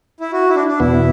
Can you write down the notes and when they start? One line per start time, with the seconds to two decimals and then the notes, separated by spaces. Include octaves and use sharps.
0.20 E4
0.32 F#4
0.50 E4
0.56 D4
0.67 D4
0.79 E2 B2 B3 E4